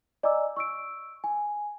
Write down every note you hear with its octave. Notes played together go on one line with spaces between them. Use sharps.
D5 D#5 G#5 A#5 D6 E6
C#6 E6 D7
G#5